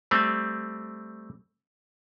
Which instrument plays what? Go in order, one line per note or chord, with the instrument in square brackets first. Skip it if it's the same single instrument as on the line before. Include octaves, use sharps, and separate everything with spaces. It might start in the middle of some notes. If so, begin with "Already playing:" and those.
[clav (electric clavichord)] G3 A3 C4